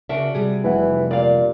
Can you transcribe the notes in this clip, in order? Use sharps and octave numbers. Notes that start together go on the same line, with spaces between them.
C#3 D4 F#4 A#4 E5
C3 G3 G#4
F1 E3 F#5
A#2 D5 F5